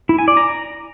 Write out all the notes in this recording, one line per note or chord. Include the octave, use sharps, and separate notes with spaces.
E4
G#5
D5
A#5